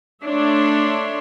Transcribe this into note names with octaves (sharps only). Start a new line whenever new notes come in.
A3 D4 C#5 E5 C6